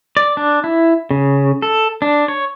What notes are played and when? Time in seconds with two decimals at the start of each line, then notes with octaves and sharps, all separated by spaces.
0.17 D5
0.37 D4
0.64 E4
1.11 C#3
1.62 A4
2.02 D4
2.28 C#5